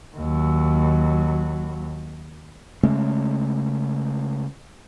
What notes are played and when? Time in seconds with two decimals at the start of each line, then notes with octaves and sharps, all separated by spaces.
0.16 D#2 F#3
2.83 C#3 G#3 A3 C#4